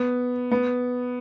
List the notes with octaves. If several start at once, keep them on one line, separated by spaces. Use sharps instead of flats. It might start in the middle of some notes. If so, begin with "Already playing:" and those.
Already playing: B3
B3